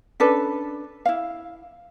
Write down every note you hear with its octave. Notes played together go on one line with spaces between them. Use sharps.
C#4 D4 A4 B4
E4 F5